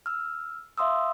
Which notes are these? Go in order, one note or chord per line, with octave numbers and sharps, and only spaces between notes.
E6 F6
E5 F5 C6 D#6 E6